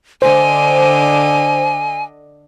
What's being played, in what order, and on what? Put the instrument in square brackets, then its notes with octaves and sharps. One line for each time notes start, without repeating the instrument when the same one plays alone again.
[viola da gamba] D3 D4 D#5 [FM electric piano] C5 [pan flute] G#5